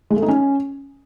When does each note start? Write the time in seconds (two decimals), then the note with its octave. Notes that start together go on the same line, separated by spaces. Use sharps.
0.10 G#3
0.16 A3
0.22 D#4
0.28 C#4